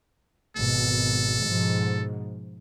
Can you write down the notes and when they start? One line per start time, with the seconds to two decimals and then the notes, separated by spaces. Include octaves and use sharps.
0.56 G#1 B2 A4
1.43 G#2 B2 F3